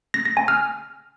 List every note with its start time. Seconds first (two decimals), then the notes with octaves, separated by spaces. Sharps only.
0.14 A#6
0.25 A#6
0.37 G#5
0.48 F6